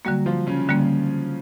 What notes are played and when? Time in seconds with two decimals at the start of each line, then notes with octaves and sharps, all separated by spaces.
0.05 D3 F#3 G3 A#3 F#4
0.26 F3 F4
0.47 C#3 C#4
0.69 D3 G3 A#3